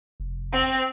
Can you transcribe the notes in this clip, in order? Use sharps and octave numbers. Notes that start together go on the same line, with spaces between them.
F1
C4